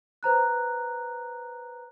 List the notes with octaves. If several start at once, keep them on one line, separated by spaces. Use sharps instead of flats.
B4 C5 A#5 F#6